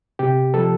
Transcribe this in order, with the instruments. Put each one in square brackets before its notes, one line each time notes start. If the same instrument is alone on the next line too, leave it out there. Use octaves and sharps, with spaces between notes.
[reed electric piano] C3 G4
F3 A4